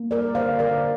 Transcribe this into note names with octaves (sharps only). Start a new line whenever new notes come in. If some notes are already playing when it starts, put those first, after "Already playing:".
Already playing: A#3
G3 A#4 D5
D3 C5 F5
D3 A#4 D5